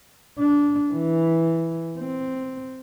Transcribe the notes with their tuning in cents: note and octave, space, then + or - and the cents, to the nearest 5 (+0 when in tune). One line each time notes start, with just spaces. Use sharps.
D4 -20
E3 -5
C4 -5